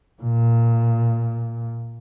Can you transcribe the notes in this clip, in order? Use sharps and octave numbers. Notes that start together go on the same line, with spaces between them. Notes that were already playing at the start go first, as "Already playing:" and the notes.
A#2